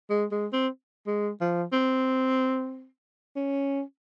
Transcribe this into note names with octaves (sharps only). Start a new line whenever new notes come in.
G#3
G#3
C4
G#3
F3
C4
C#4